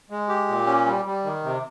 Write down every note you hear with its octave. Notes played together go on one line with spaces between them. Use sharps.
G#3
G4
A#2
C#4
G3
G3
D#3
C3